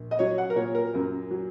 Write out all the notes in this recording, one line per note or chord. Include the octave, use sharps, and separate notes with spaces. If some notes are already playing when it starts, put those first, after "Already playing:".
Already playing: A#1
D#5
F#3 C#5
F#5
A#4
A#2 C#5
A#4
F#2 A#4
F#3